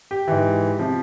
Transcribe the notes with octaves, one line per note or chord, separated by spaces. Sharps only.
G4
G#2 E3
C3 F3